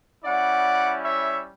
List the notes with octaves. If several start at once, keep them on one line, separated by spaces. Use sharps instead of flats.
G3 C#4 E4 D5 F#5
C#5 E5